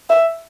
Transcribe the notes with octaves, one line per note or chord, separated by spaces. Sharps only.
E5